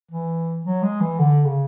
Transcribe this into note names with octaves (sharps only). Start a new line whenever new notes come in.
E3
F#3
G#3
E3
D3
C#3